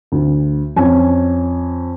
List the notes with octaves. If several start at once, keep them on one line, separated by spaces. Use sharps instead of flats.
D2
F2 C#4 G#5